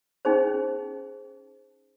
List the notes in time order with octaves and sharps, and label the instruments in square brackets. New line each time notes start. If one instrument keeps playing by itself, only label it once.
[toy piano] C#4 D#4 G#4 C5